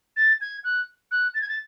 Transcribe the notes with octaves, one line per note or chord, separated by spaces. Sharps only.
A6
G#6
F#6
F#6
A6
G#6
A6